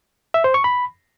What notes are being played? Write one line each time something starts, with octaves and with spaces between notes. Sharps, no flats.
E5
C5
C#6
B5